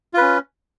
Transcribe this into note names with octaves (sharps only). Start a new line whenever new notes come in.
C#4 F4 B4